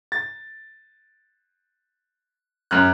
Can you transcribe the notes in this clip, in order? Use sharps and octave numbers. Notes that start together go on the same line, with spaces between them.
A6
F#2 F6 F#6